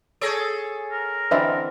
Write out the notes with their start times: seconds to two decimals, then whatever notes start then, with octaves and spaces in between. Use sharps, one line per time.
0.21 G#4 A4 C#5 G6 A#6 D7
0.92 A#4
1.31 D3 E3 C4 B4 D#5 E5